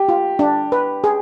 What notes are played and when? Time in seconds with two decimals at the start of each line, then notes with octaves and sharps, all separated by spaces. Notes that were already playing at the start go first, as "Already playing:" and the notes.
Already playing: G4
0.09 F4
0.39 D4
0.72 B4
1.04 G#4